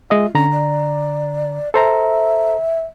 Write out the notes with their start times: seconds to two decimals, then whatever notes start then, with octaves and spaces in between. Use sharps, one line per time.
0.10 G#3 F4 D#5 E5
0.35 D3 C#4 A#5
0.52 D5
1.74 A4 C5 E5 A#5